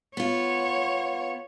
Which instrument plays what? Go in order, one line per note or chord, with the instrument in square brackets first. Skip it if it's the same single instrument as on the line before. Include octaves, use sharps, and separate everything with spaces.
[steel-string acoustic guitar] B3 F4 [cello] C#5